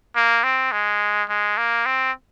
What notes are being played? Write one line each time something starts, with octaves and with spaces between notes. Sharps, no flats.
A#3
C4
G#3
G#3
A#3
C4